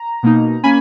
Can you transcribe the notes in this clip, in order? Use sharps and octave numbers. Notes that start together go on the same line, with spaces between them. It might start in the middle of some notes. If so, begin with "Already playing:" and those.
Already playing: A#5
B2 A#3 D#4
A#3 C#4 G#5 B5